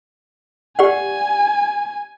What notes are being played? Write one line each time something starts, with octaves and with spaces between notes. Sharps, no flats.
G4 D5 F#5 G#5